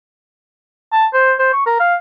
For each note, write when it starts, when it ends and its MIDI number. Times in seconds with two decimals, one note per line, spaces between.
0.92 1.06 81
1.13 1.33 72
1.39 1.51 72
1.53 1.63 85
1.66 1.78 70
1.80 1.96 77